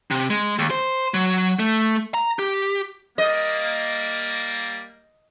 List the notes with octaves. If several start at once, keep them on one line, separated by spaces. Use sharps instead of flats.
C3
G#3
D#2
C5
F#3
A3
A#5
G4
G3 A#3 D#5